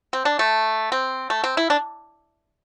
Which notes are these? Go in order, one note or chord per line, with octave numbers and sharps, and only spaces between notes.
C4
D4
A3
C4
A3
C4
E4
D4